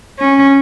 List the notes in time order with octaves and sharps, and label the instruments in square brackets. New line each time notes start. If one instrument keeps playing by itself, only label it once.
[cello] C#4